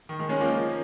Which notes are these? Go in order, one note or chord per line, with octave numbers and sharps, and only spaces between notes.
D#3
D#3 G#3
G#3 C#4
F3 A#3